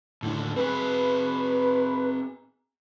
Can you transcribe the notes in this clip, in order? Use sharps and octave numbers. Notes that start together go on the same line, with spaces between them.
D#2 A2 D3
C4 G#4 B4